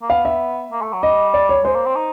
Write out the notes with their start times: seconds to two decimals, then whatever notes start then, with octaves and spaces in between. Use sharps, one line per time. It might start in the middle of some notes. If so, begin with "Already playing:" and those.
0.02 A#3
0.09 B3 F5
0.25 E5
0.72 A#3
0.82 A3
0.93 F#3
1.03 G3 D#5
1.34 D5
1.49 C#5
1.64 G#3 C5
1.75 A#3
1.86 C4
1.96 D#4